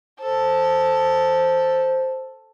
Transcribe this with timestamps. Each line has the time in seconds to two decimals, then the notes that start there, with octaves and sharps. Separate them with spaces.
0.21 A4 C5